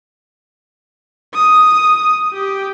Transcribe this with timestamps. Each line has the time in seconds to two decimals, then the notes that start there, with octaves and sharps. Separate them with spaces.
1.34 D#6
2.33 G4